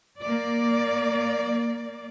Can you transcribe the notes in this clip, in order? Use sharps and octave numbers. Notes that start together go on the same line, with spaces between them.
A#3 D5